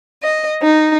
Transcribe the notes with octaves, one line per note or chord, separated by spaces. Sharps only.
D#5
D#4